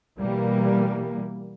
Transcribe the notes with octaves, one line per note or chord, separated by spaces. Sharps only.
B2 E3 G3 A#3